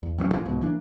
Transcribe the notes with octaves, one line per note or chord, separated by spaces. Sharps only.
E2
A1 F#3 A3 C#4
A#2 E3 F3
C2 G#2 B2
E3 A#3 D4